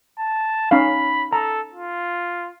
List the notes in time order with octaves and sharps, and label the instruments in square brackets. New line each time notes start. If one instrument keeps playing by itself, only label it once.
[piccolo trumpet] A5
[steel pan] C#4 D#4 F5 [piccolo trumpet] B5
[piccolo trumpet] A4 [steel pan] A#5
[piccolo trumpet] F4